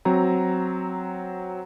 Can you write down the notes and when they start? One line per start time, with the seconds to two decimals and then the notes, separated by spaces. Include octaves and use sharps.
0.05 F#3 C4 A#5